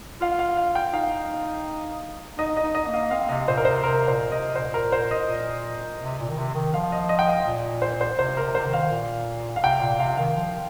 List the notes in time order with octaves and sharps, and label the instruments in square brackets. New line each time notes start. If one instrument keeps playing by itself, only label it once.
[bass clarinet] F4 [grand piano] F5
[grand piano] F5
F5
G5
[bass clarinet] D#4 [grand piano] F5
[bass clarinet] D#4 [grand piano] D#5
[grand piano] D#5
[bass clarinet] D#4
[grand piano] D#5
[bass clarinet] A#3
[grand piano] F5
[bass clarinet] C4 [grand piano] F5
[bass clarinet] C3 [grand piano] D#5
[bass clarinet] A#2 [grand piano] C5
[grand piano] A#4
[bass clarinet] C3 [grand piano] C5
[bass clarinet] C3 [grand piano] A#4
[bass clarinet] A#2 [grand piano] C5
[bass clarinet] C3 [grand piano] D#5
[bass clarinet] A#2 [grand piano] C5
[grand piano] A#4
C5
D#5
[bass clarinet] A#2
C3
A#2
D#3
C3
D#3
[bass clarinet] F3 [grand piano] F5
[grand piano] D#5
D#5
G5
F5
[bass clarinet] A#2
[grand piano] C5
C5
[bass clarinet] C3 [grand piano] C5
[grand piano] A#4
[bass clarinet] C3
[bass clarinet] C3 [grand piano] C5
[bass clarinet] D#3
[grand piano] F5
[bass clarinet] A#2
[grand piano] F5
[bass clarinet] C3 [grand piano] G5
[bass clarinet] A#2 [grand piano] F5
[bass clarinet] C3 [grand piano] F5
[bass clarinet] D#3 [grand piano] F5
[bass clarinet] F3